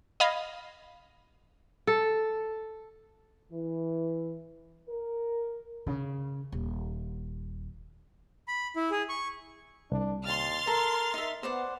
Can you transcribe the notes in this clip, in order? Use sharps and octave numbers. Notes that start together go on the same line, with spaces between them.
D#5 F5 B5 G#6
A4
E3
A#4
C#3
D#1
B5
E4
G#4
C#6
C2 D4
D#2 C6 F6 A6
A4 A#4 A#5
D#4 E5
B3 C5 D5 F#5